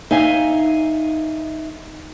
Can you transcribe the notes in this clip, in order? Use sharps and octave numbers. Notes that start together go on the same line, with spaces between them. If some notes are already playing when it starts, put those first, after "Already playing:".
D#4 E5 F5 G#5